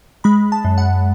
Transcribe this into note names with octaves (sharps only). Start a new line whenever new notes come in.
G#3 B5
A5
F#2
F#5